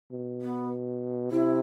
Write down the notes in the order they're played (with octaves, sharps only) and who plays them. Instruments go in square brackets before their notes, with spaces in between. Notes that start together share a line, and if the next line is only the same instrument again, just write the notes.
[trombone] B2
[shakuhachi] B3
[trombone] C3 [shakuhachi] E4